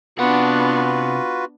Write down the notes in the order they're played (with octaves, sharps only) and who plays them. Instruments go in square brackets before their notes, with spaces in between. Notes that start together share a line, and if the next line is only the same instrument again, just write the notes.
[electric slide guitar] C3 F#5 [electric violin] B3 D4 [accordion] F4 F#4 B4